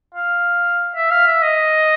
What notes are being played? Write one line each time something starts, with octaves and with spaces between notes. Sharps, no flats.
F5
E5
F5
E5
D#5